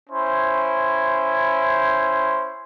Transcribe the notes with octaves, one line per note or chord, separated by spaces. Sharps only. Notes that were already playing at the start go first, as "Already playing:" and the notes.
C#4 E4 C5